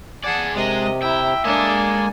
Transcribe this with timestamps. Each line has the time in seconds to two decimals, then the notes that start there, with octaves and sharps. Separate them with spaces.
0.24 G#4 D5 F#5 G#5 A5
0.55 C3 G#3 D4 A#4 D#5
1.02 E4 E5 G5 A#5
1.44 G#3 A#3 D4 A4 D#5 G#5